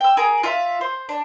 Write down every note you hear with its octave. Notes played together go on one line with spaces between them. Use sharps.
G5 E6
G#4 A#4
F4 E5 F5
C5
D4